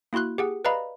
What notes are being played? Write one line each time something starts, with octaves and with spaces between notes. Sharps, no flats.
A#3 E4 F#4 C6 F#6
G4 G#4 F#5
B4 D5 D#5 F5 A#5 B5